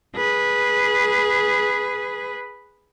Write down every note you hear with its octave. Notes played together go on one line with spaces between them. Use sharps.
G#4 B4